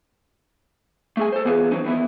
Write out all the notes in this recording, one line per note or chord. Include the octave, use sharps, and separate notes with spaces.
A3 G#4 G#5
A4 C5
E3 B3 C4 F4 G#4 B4
E3 F#3 C4 C#4 D#4
D#3 E3 B3 D#4 E4